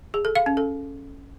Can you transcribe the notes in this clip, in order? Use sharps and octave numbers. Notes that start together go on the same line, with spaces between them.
G#4
A4
F5
C#4
A4